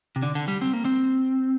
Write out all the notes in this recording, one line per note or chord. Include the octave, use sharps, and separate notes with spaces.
C3
D3
D3
G3
C4
A#3
C4